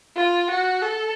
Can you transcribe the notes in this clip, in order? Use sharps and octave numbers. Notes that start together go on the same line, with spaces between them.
F4
F#4
A4